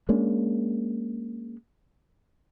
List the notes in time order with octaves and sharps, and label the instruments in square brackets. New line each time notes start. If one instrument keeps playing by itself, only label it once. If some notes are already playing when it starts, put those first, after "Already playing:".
[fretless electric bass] G#3 A#3 C#4 D4